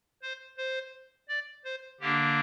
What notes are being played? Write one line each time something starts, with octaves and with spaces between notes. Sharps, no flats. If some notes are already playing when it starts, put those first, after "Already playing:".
C5
C5
D5
C5
D3 A#3 D4 G4